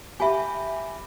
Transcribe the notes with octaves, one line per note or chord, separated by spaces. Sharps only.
G4 E5 G#5 B5